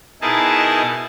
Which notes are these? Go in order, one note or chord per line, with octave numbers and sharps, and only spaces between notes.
B2 D#4 E4 G#4 A#4 A5